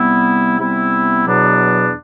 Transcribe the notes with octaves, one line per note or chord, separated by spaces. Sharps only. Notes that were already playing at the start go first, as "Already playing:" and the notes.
Already playing: C3 G3 B3 E4
C3 G3 B3 E4
E2 B2 F#3 B3 D4